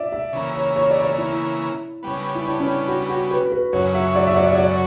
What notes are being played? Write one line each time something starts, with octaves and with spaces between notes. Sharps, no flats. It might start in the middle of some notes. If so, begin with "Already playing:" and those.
Already playing: D5 E5
E5
C#3 E3 A#3
C#5
C#5
D5
D5
E4
C#3 G3 B3
E4
D4
C#4
F#4
F#4
B4
B4
F#2 C#3 F#3 C#5
E5
D5
E5
D5
D5
D5